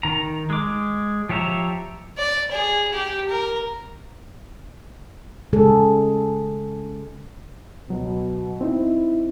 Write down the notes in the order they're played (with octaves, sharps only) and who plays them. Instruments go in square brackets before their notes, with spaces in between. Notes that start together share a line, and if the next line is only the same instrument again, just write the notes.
[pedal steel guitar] D#3 A#5
G#3 D6
F3 G4 C#5 E5 A#5
[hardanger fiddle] D5
G#4
G4
A#4
[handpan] C#3 G#3 G#4 A4
[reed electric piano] C#2 F#3 [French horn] B2
[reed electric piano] C4 D#4 [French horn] E4